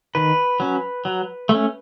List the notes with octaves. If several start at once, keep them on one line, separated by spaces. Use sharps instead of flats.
D#3 B4
F#3 C#4
F#3
A3 C#4